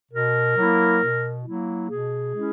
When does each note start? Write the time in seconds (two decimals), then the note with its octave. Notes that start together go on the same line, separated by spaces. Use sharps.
0.12 B2 A#4
0.56 F#3 A#3 E4
1.00 B2
1.45 F#3 A#3 E4
1.89 B2 G#4
2.34 G#3 C#4 E4